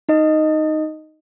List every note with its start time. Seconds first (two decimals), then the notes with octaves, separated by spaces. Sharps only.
0.09 D#4 D#5